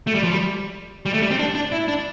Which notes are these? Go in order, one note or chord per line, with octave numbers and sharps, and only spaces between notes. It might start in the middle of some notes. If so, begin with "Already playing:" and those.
A3
G3
F3
G3
G3
A3
G3
C4
D4
D4
E4
D4